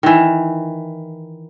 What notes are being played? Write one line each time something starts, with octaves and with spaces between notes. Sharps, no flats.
D#3 E3